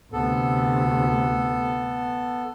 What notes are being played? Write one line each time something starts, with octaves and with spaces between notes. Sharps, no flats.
D2 C3 B3 A4